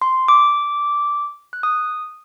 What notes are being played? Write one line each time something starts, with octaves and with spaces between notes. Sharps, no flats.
C6
D6
F#6
D#6